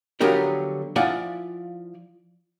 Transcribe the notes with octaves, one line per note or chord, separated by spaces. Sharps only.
D3 F3 F#3 B3 G4 A#4
F3 E4 F4 D5 F#5 G#5